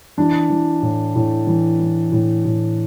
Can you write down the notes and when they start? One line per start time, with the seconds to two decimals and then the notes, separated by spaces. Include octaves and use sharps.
0.17 E3 D4
0.50 E3
0.82 A2
1.15 A2
1.47 E3
1.80 E3
2.12 A2
2.45 A2